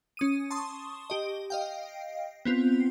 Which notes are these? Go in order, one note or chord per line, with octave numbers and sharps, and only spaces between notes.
C#4 D#6 D#7
A5 C6 C#6 D#6
G4 D#5
D#5 F5 G5
B3 C4 F4